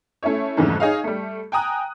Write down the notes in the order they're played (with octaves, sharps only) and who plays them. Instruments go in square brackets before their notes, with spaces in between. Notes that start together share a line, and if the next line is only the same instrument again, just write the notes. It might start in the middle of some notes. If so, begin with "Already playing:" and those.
[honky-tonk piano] A3 C#4 E4 C#5
F2 G#2 C#3 E3 G3 A3
D#4 G#4 C#5 D#5 F5
G3 A3
G5 G#5 A#5 D#6 F#6